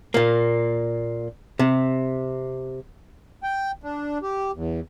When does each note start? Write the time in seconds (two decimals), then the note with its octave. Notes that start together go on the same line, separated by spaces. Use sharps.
0.14 A#2 A#3
1.59 C3
3.43 G5
3.83 D4
4.22 G4
4.55 E2